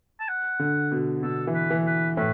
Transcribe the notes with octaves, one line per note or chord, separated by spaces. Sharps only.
A5
F#5
D3
B2
B2 A4
E3
B4
E3
B4
A2 B4